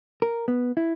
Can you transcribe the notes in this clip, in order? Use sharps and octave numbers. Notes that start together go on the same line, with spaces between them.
A#4
B3
E4